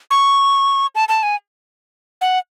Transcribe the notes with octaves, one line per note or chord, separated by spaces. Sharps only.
C#6
A5
A5
G#5
F#5